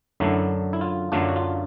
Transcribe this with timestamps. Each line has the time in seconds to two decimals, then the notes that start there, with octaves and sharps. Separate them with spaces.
0.20 F#2 D3 F#3 A3 D4 E4
0.73 E4
0.81 F4
1.12 F#2 D3 F#3 A3 D4 F4
1.29 F#4
1.36 F4